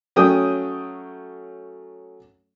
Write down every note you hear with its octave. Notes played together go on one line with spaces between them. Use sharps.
F#3 A3 C#4 G5 D#6